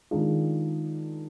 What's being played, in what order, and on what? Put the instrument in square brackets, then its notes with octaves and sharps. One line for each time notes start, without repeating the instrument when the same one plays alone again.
[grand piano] D#3 G#3 D4 F4 G#4